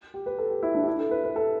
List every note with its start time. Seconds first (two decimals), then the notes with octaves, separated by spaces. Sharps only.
0.14 G4
0.26 B4
0.38 A4
0.50 G4
0.63 E4
0.75 D4
0.82 G4
0.87 E4
0.99 A4
1.11 B4
1.24 B4
1.36 A4